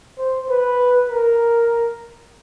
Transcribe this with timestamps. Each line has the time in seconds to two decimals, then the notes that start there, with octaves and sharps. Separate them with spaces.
0.18 C5
0.49 B4
1.09 A#4